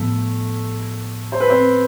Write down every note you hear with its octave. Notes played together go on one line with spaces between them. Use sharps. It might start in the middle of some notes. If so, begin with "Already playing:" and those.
Already playing: A2 F3 A3 B3
C5
B4
C4 C5